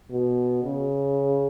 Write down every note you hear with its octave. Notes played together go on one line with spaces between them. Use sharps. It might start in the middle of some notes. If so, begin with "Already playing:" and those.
B2
C#3